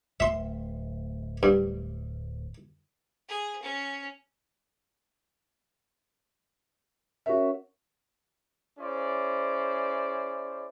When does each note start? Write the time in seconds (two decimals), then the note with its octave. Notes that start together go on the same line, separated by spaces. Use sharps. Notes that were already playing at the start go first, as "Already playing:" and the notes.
0.20 D1 A3 E5 C6
1.43 G2
3.28 G#4
3.62 C#4
7.26 C#4 F#4 A#4 C#5 E5
8.79 C#4 E4 G#4 C5 D5